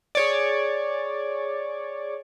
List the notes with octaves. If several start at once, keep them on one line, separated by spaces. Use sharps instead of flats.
G#4 C#5 D5